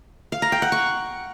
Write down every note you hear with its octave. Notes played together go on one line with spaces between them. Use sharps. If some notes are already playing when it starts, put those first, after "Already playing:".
F5
A#5
G5
F#5
C#6